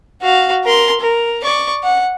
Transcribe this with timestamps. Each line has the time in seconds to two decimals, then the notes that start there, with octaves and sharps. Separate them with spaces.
0.22 F#4 F5
0.64 A#4 C6
1.00 A#4
1.43 D5 C#6
1.83 F#5